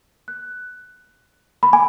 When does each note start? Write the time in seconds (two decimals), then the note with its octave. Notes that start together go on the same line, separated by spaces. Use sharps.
0.28 F#6
1.63 B5
1.73 G#5